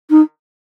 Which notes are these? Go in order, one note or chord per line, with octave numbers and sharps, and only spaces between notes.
D#4